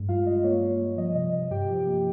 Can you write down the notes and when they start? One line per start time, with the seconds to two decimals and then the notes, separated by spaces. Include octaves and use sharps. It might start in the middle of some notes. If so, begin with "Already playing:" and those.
Already playing: G2 G#3
0.08 G3 F4 F5
0.26 G2 D#5
0.44 A#3 C#5
0.61 G3
0.80 G3
0.97 F3 D#5
1.15 C3 D#5
1.34 C3 D#5
1.51 G2 G4 G5
1.69 F3
1.87 A#3